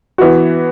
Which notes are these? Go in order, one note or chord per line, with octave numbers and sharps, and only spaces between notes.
E3 B3 F#4